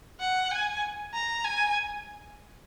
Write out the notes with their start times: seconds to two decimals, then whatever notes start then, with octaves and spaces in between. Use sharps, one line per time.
0.20 F#5
0.51 G#5
1.14 A#5
1.44 G#5